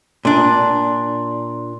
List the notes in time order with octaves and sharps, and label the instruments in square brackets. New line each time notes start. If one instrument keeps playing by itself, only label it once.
[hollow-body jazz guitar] A#2 D4